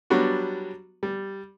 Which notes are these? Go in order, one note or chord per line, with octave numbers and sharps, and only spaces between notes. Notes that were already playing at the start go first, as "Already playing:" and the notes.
F#3 G3 B3 D4 F#4
G3